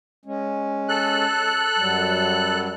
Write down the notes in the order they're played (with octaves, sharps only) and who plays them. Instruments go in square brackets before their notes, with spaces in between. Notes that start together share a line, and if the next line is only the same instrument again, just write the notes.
[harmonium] G#3 C#4
[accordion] A4 F#6
[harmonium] F#2 F#3 G3